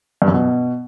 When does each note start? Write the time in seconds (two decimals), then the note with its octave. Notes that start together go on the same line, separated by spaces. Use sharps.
0.22 G2
0.28 F#2
0.34 B2